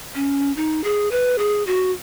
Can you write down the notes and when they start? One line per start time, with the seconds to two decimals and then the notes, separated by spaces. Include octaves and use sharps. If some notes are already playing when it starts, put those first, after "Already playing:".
0.15 C#4
0.57 D#4
0.84 G#4
1.11 B4
1.39 G#4
1.67 F#4